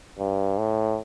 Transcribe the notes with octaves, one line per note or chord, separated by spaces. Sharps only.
G2
A2